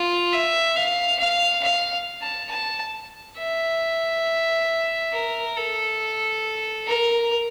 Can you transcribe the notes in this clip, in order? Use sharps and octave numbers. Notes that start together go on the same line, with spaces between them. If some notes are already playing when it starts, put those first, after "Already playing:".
Already playing: F4
E5
F5
F5
F5
A5
A5
E5
A#4
A4
A#4